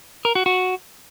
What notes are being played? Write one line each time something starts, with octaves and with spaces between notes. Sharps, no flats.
A#4
F#4
F#4